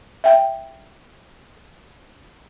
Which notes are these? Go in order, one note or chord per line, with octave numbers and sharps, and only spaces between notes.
E5 G5